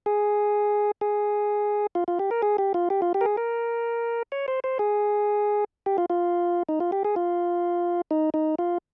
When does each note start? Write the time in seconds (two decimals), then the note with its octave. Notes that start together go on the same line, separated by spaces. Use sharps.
0.06 G#4
1.01 G#4
1.95 F4
2.08 F4
2.19 G4
2.31 A#4
2.42 G#4
2.58 G4
2.74 F4
2.90 G4
3.02 F4
3.14 G4
3.21 A#4
3.26 G#4
3.37 A#4
4.32 C#5
4.48 C5
4.64 C5
4.79 G#4
5.86 G4
5.98 F4
6.10 F4
6.69 D#4
6.80 F4
6.92 G4
7.05 G#4
7.16 F4
8.11 D#4
8.34 D#4
8.59 F4